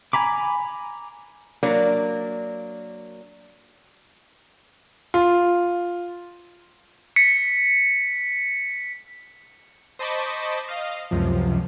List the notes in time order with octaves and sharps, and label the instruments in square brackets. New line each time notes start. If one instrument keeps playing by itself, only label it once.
[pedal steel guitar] G#5 A#5 B5 D6
[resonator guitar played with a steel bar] F#3 A#3 D4
[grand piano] F4
[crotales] B6 C#7
[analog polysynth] C5 D#5 A5 B5 C#6 D6
D#5 F5
C#2 F#2 C3 F3